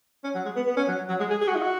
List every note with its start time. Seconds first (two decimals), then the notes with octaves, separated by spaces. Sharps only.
0.24 C#4
0.35 F#3
0.46 G#3
0.56 B3
0.67 B3
0.77 C#4
0.88 F#3
1.09 F#3
1.20 G#3
1.30 G#4
1.41 G#4
1.48 F#4
1.55 D#4
1.62 F#4